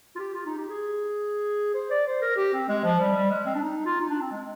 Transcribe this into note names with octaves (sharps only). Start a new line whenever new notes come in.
F4
G4
F4
D#4
G4
G#4
C5
D5
C5
A#4
G4
C4
G#3
F3
G3
G3
G#3
C4
D4
D#4
F4
D#4
D4
C4
G#3